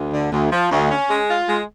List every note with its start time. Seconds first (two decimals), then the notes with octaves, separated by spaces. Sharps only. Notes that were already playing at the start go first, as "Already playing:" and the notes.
Already playing: D2
0.13 D3
0.32 D2
0.51 F3
0.71 D2
0.90 C#4
1.09 G#3
1.29 F4
1.48 G#3